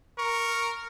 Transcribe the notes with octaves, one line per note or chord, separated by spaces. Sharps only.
A#4 C#6